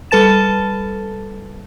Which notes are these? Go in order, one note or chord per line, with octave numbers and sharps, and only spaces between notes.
G3 A4 B4 A5 A6 E7